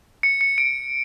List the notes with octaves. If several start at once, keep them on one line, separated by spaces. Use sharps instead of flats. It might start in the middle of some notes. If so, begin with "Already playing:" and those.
C#7
C#7
D7